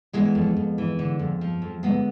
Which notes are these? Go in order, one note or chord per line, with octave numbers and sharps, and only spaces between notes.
E3 G#3 B3
F2
F2
E3
D3
F2
F3
F2
D3 G#3 B3